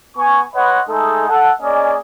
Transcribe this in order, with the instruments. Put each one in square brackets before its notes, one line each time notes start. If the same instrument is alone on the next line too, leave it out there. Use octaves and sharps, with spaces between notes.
[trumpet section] B3 G#5 C#6
B4 C#5 D#5 F#5 B5 C6
G#3 A3 D#4 G#4 A4
A4 F#5
A#3 C#4 G#4 D5 D#5